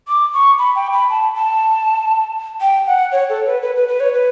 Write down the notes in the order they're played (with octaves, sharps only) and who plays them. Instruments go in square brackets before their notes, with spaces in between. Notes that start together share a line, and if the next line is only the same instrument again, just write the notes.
[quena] D6
C#6
B5
G5
B5
A5
A5
G5
F#5
C#5
A4
B4
B4
B4
B4
C#5
B4